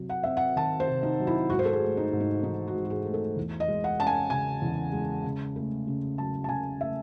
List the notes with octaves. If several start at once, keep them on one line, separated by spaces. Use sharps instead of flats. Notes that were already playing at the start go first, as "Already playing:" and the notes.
Already playing: C3 F#3
F#5
C4 E5
F#5
D#3 A5
C5
C3
D#4
F#3
E4
G#2 F#4
C5
A4
G#4
A3
D#4
G#2
D#4
E3 D#4
F#4
G#2
F#4
G#4
A3
A4
E2
D#5
G#3
F#5
C#4 A5
G#5
C#3 G#5
E2
G#3
C#3
A3
C#3
F#3 A5
A5
C#3 G#5
A3 E5